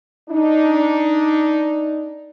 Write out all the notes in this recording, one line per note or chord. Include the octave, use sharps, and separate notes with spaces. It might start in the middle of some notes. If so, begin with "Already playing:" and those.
D4 D#4